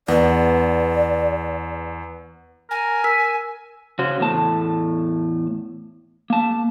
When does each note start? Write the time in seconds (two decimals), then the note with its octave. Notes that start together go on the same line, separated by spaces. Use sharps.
0.08 E2 B3 D5
2.70 A#4 G#5
3.04 A#4 E6 B6
3.99 C#3 C#4 F#4 C5
4.20 E2 A2 A5
6.30 A#3 A5